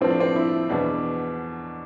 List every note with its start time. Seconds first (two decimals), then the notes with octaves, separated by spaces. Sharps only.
0.01 A2 F3 C4
0.10 D4
0.20 C4
0.36 E4
0.69 E2 B2 D4